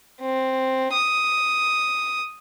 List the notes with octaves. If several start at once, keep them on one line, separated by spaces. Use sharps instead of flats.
C4
D#6